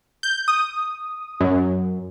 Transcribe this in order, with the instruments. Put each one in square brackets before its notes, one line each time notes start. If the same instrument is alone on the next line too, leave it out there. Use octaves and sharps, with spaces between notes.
[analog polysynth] G6
D#6
F#2